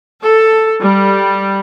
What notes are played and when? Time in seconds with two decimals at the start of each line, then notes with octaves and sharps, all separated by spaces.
0.21 A4
0.81 G3